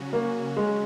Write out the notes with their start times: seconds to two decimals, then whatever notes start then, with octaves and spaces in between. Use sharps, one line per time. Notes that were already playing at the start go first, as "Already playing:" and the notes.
Already playing: C#3 F#3 C#4 F#4
0.13 A#3
0.57 G#3